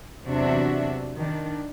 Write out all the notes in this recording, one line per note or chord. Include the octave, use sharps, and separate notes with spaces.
E2 C3 F#3 D4 F#4 E5
D#3 D4